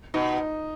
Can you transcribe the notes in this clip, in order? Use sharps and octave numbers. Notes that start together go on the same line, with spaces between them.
B2 D#4